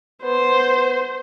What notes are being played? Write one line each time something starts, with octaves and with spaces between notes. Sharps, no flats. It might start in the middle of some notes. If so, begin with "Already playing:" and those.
B3 C5